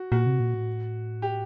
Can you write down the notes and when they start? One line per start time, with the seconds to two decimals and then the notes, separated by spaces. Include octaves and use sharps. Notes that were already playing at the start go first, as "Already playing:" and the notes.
Already playing: F#4
0.12 A#2 F#4
0.26 C3
0.40 A#2
0.54 A2
1.22 G4